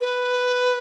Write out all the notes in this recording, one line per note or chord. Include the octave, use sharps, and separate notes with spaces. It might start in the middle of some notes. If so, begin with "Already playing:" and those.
B4